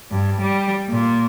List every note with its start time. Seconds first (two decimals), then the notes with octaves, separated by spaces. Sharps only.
0.11 G2
0.41 G3
0.90 A#2